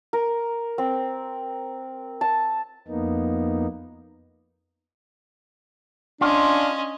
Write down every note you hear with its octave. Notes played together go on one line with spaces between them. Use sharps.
A#4
C4
A5
F2 A#3 B3 D#4
C#4 D4 F4 D#5